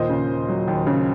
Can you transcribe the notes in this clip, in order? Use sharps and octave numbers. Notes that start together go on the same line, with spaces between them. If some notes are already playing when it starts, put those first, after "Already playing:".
Already playing: D#2 A#2 C5 D#5
C#3
D#2
F#3
D#2
C#3